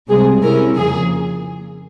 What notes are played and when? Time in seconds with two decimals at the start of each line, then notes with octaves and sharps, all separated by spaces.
0.09 C#2 C3 G3 G#4
0.43 C3 G3 C#4 E4 A#4
0.76 F2 C#3 F3 A#3 G#4